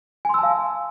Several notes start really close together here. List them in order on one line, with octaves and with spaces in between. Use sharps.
G#5 C6 E6 A5 F5